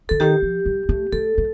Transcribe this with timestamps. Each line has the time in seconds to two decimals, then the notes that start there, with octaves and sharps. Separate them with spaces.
0.09 D3 A4
0.20 D#3 G4
0.42 F3
0.66 G3
0.89 A3
1.13 A3 A4
1.38 A3